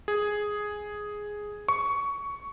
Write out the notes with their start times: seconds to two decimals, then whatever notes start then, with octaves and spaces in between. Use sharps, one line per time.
0.08 G#4
1.68 C#6